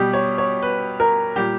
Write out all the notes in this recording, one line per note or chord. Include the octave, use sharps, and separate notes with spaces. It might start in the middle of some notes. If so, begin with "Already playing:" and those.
Already playing: B2 G3 G4
C#5
C#5
B4
A#4
A#2 G3 G4